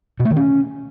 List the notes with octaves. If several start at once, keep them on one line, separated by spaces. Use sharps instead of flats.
B2
A3
D#3
C#4